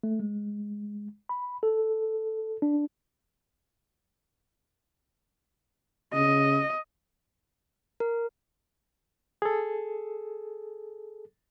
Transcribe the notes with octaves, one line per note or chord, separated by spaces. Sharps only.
A3
G#3
B5
A4
D4
C#3 D#5
A#4
G#4 A4